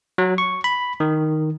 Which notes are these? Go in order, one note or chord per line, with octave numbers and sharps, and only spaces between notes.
F#3
C#6
B5
D#3